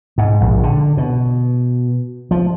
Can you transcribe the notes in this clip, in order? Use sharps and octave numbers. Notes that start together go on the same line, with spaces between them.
G#2
A#1
D3
B2
F3